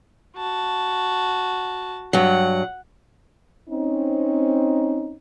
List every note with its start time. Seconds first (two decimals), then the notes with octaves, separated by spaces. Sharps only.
0.36 F#4 A5
2.13 G2 F#3 F#5
3.69 C4 C#4 D#4